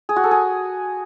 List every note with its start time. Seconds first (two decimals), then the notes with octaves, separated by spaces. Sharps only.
0.09 G#4
0.16 F#4
0.24 A4
0.31 G#4